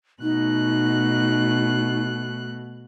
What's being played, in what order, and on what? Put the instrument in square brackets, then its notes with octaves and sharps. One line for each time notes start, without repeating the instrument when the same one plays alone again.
[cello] B2 [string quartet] A3 F#6 [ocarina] D#4